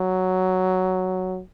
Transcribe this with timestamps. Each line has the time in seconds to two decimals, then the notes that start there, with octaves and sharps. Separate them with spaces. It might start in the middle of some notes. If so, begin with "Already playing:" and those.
Already playing: F#3